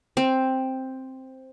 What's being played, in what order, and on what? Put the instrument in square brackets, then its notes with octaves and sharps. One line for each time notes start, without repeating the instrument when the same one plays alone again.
[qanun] C4